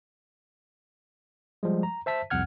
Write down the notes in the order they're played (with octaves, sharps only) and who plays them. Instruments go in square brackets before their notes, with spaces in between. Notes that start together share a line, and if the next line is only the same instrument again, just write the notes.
[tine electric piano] F3 G3 G#3
A#5
C5 E5 A5 B6
C2 F2 F#5 F6 G#6